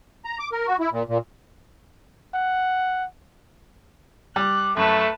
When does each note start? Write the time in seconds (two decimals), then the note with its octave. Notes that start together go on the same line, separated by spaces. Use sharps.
0.25 A#5
0.39 D6
0.52 A#4
0.67 F#4
0.80 E4
0.92 A#2
1.08 A#2
2.35 F#5
4.36 G3 D6 F#6
4.77 F#2 A3 B4 A5 C#6